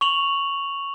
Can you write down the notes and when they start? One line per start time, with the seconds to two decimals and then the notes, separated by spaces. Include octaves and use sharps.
0.01 C#6 F7 F#7